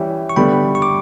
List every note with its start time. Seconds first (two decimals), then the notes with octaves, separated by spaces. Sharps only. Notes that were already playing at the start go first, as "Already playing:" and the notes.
Already playing: E3 G3 C#4 E5 G5
0.29 C#6
0.36 D3 G3 B3 G5 B5
0.75 C#6
0.82 D6